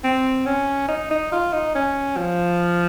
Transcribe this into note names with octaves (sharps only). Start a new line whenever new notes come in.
C4
C#4
D#4
D#4
F4
D#4
C#4
F3